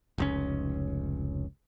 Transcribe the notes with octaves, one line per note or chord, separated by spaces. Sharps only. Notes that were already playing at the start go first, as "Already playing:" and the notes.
F1 C#2 C#4